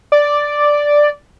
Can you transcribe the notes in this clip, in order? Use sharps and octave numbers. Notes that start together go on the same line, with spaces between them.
D5